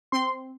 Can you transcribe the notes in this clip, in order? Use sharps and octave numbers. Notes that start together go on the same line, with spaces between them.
C4 C6